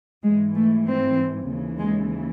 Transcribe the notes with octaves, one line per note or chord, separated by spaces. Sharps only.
G#2 E3 G#3
A3
C4
D#2 C#3 E3
G#3